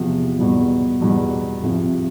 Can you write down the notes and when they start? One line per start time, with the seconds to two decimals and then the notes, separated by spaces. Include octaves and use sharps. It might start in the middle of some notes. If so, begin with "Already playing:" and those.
Already playing: E2 C3 F3
0.39 E2 B2 G3
1.01 E2 B2 G3
1.63 C2 C3 F3